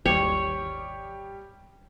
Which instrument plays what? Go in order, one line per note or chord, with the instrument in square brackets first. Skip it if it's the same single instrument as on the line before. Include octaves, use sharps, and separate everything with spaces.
[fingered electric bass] G#1 D#2 [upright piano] G3 G4 [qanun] C#5